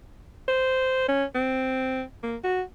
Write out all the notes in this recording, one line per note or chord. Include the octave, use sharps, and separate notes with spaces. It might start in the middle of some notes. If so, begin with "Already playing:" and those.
C5
C#4
C4
A#3
F#4